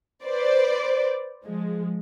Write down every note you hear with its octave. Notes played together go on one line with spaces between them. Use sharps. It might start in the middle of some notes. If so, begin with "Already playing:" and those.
B4 C5 D5
F3 G#3